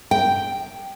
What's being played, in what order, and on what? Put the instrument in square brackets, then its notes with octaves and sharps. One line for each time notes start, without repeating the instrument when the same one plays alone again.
[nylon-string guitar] G5